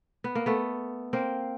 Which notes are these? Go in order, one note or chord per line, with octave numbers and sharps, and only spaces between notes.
B3
A#3
A3 B3
A#3 C4